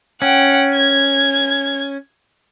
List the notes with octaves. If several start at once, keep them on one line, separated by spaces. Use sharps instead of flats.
C#4 F#5 G5
G#6